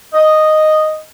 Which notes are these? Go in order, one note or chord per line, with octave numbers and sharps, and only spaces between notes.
D#5